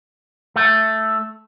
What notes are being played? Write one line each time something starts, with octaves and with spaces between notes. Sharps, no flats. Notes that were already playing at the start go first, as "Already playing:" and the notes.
A3